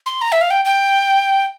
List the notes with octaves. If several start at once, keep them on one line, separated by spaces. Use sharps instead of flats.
C6
A#5
E5
F5
G5
G5